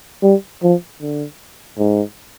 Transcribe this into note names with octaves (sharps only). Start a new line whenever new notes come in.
G3
F3
D3
G#2